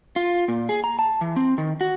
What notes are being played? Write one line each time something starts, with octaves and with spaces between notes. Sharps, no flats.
F4
A#2
G#4
A#5
A5
E3
C4
D#3
F#4